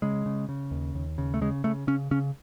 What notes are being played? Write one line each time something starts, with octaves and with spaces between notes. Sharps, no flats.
C#3 G#3
C#3
C#3
D#2
D#2
C#3
A3
C#3 G#3
C#3 A3
C#3 C#4
C#3 C#4